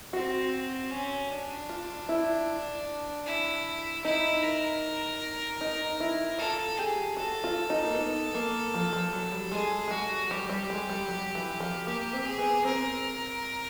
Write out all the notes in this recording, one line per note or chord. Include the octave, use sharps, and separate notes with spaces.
C4 F#4
C#4
D4
F4
E4
E4
D#4 E4
A#4
D#4
E4
F4 A4
G4 G#4
F#4 A4
F4
D#4
A#3
B3
A#3
F3
F3
F#3
G3
G#3 G#4
G#3
G3 F#4
G3 G4
G3
G#3
G3
F#3
E3
F3
A#3 G4
C4
G#4
B3
C4 A#4